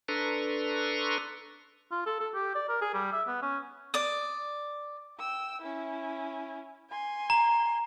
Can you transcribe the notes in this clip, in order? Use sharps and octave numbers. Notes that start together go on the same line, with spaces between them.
D4 A4 B4 A#5 C6 C#6
F4
A4
A4
G4
D5
A#4
G#4
G3
E5
B3
C#4
D5 D#6
G5 E6
C#4 E4
G#5 C6
A#5